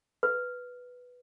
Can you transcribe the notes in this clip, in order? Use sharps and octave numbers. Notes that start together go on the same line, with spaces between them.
B4